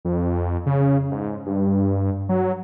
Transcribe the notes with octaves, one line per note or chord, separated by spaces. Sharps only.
F2
F2
C#3
G#2
G2
F#3